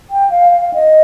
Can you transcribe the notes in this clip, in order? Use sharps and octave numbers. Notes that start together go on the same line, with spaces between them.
G5
F5
F5
D#5